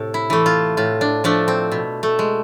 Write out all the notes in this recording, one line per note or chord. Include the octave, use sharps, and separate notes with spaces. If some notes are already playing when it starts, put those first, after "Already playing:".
Already playing: A2 C3 A4
E4
E3 A3
F4
A2 F4
D4
F3 A3 D4
C4
B2
A3
G#3